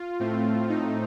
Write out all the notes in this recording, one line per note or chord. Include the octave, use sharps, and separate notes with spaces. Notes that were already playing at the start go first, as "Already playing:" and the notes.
Already playing: F4
A2 A3 C4
D#4